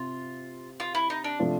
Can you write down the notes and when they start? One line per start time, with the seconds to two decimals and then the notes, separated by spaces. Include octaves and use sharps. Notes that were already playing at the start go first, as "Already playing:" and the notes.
Already playing: C3 C4 F4
0.80 F4
0.95 E4
1.10 D#4
1.24 D4
1.39 C3 F3 A3 D4 F4